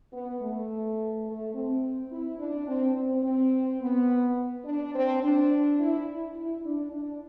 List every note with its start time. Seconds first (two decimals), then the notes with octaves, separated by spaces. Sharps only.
0.12 B3
0.40 A3
1.26 A3
1.54 C4
2.11 E4
2.38 D4
2.67 C4
2.96 C4
3.24 C4
3.81 B3
4.65 D4
4.94 C4
5.22 D4
5.79 E4
6.35 E4
6.65 D4
6.93 D4